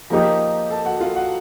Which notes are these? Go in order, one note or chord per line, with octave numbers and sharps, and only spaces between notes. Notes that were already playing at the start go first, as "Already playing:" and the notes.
F3 A#3 D#4 G4 A#4 A#5
A4 A5
F#4 F#5
F4 F5
F#4 F#5